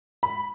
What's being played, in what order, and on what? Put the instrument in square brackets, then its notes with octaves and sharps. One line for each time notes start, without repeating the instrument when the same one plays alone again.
[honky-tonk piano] B5